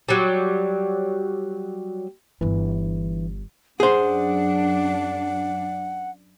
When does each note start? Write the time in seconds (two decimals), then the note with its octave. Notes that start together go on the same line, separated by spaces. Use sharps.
0.09 F#3 G3
2.41 G1 D3 E3
3.80 F#2 D4 G#4 C5 F#5